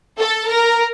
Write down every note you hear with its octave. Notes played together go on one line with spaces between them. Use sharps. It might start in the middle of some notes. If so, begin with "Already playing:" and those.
A4
A#4